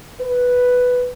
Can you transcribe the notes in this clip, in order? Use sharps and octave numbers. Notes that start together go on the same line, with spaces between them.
B4